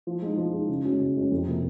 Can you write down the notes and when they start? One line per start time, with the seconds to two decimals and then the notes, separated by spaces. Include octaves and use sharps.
0.07 F3
0.22 G#3 D#4
0.38 F3
0.53 G#3 D#4
0.69 C#3
0.85 G#3 C#4 F#4
1.00 C#3
1.16 G#3 C#4 F#4
1.31 F2
1.47 C3 F3 A#3